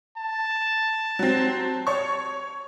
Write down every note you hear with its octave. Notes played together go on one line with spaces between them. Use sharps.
A5
F#3 C4
C#5 C#6